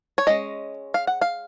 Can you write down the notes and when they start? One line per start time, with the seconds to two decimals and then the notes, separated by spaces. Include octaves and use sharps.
0.18 C#5
0.27 G#3 C#4 D#5
0.94 F5
1.07 F#5
1.21 F5